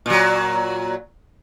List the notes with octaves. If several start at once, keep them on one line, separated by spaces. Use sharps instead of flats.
A#2 F#3